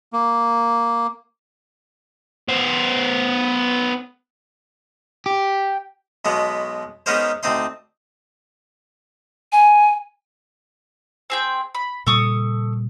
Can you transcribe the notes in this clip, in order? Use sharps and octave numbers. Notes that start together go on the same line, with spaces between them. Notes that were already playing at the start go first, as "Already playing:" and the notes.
A#3
B3 C5
G4
B1 B2 G#3 B3
G#3 B3 C#4 D#4 A#4 C5
D2 C4 D#4 C6
G#5
C4 G#4 G5
B5
A#2 C#3 G3 A4 C#6 D#6